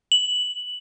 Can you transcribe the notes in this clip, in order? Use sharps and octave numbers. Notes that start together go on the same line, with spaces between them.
F#7